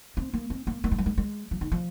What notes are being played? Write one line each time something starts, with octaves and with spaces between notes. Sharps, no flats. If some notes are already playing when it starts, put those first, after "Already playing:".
C4
A#3
C4
A#3
A#3
G#3
G3
G#3
G#3
F3
D#3
F3